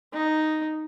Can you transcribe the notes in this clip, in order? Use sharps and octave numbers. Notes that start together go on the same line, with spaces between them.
D#4